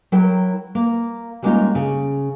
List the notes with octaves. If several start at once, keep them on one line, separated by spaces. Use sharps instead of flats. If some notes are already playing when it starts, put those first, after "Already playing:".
F#3 E4 A#4 G5
A#3
G3 G#3 A#3 C#4 D#4 F4
C#3